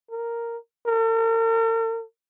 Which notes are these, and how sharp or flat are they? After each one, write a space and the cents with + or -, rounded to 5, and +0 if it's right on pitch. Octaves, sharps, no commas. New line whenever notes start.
A#4 -5
A#4 -45